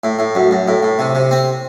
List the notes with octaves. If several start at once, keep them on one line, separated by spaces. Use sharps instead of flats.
A2
A2
F#2
F#2
A2
A2
C3
C3
C4